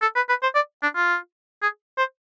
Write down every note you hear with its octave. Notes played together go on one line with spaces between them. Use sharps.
A4
B4
B4
C5
D5
D4
F4
G#4
C5